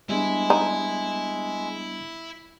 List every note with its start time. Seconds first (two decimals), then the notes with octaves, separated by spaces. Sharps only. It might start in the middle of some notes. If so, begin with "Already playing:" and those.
0.09 G3 G#3 B3 D4 E4
0.50 D#4